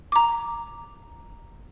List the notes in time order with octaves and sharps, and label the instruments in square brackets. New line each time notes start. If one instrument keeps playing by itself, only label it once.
[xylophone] A#5 D6